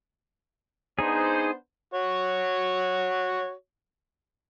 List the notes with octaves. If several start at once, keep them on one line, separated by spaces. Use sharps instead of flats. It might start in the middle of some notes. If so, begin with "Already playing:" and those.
B3 D4 D#4 G#4 C5
F#4 C#5